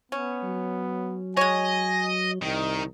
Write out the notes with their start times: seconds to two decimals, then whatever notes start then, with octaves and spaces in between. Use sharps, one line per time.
0.12 B3 C#4
0.43 F#3
1.37 G#3 C#5 D#5 G#5
2.42 C2 D#3 D#5